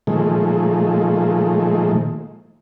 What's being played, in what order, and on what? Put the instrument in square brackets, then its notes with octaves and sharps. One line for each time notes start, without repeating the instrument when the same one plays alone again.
[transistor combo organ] A#2 D#3 F3 G#3 A3